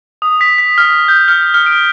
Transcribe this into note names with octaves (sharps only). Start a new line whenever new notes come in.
D#6
B6
B6
F6
G6
F6
F6
D7